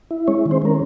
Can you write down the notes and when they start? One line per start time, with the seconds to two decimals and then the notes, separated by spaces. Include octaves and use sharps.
0.11 E4
0.28 G#3 C#4 C#5
0.46 D#3
0.51 C4 C5
0.62 C#4 A#4